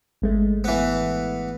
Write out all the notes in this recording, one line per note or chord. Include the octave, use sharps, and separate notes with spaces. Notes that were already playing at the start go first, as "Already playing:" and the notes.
G#1 G#3 A3
E3 B3